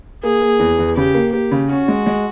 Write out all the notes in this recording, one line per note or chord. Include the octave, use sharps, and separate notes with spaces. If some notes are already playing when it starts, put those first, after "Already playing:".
A#3 G#4
A#3
E2
E2
C#3 G4
A#3
A#3 G4
C#3
C#4 F#4
G#3
G#3